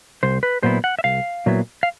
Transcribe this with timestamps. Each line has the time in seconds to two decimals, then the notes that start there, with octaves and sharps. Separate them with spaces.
0.23 C2 C5
0.43 B4
0.63 A#2 F#3 B3 E4 C5
0.84 F#5
0.99 E5
1.04 C2 F5
1.46 A#2 F#3 B3 E4
1.83 F5